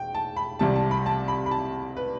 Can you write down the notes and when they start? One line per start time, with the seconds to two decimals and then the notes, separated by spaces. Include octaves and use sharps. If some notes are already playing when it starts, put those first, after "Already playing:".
Already playing: E1 G5
0.15 A5
0.37 B5
0.59 C2 C3 G3 A5
0.75 A5
0.91 B5
1.06 A5
1.28 B5
1.46 B5
1.51 A5
1.97 B4